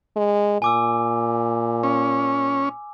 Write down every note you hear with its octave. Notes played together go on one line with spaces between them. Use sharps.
G#3
A#2 G#5 D6 E6
C#4